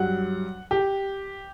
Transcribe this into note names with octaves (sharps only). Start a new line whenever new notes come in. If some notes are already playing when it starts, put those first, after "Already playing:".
Already playing: G2 F#3 F#5
G4